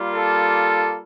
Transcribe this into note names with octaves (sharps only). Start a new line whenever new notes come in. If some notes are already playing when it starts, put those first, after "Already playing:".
Already playing: G3 A#3 F4
A4